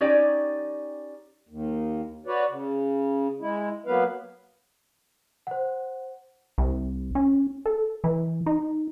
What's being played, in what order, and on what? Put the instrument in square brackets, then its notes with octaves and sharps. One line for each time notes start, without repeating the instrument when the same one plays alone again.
[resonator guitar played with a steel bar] C#4 D#4 G4 D5
[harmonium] D#2
F#4 B4 C#5 D5
C#3
G#3 E4
F#3 A#3 B3 B4 F5
[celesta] C5 F#5
[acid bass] C2
C#4
A4
E3
D#4